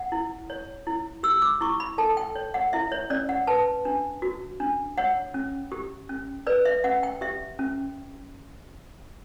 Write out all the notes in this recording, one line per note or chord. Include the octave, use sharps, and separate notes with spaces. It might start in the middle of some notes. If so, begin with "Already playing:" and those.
Already playing: F#5
E4
C#5
E4
G4 E6
D6
E4 C#6
B5
A4 A5
G5
C#5
F#5
E4 E5
C#5
C#4 D5
F#5
B4 A5
D4
F#4
D4
C#5 F#5
C#4
G4
C#4
B4 D5
E5
C#4 F#5
G5
G4 E5
C#4